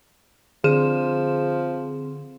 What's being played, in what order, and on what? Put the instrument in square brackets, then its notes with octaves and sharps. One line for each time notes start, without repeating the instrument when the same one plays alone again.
[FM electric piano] D3 [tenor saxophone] F3 [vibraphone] C4 [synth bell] G#4 E7